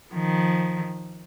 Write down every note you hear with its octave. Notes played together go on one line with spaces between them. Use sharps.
D#3 F3